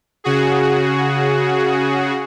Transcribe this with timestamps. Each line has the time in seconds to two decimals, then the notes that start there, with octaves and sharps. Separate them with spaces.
0.24 C#3 F#4 G#4